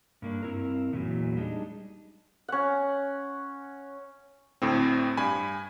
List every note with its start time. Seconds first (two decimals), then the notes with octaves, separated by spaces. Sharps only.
0.22 G2 A#3 D4
0.43 G2 C4 E4 A#4
0.92 E2 A#2 D3 E3 F#3
1.37 G3 G#3 D4 D#4
2.48 C#4 F#5
4.62 D2 A2 C4
5.17 G2 G#5 B5